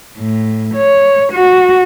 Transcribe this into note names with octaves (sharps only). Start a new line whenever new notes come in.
A2
C#5
F#4